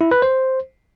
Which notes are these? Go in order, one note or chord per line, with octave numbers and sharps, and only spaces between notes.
E4
B4
C5